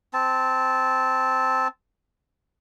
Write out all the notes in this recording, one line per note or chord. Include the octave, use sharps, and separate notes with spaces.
C4 A5